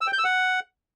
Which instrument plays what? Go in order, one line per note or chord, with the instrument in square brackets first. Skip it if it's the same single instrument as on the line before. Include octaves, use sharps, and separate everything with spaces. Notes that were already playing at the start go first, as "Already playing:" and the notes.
[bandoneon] E6
G5
G6
E6
F#5